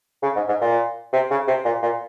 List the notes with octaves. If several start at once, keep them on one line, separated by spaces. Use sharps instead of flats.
C#3
G#2
G#2
A#2
C3
C#3
C3
A#2
A#2